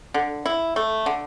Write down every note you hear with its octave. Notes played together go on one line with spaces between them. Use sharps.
D3
E4
A3
D3